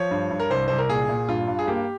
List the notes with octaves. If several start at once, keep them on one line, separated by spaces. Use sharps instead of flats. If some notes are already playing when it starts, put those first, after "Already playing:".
Already playing: F3 C#5
G2
G2
A#4
C2 C5
C2 C5
A#4
A#2 G#4
A#2
G2 F4
G2
G#4
A#3 G4